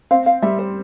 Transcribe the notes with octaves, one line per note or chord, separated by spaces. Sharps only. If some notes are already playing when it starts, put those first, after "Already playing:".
C4 F5
F5
G3 E5
C5